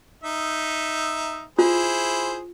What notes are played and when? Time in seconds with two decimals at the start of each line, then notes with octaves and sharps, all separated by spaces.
0.24 D#4 E5
1.59 E4 F4 G#4 C5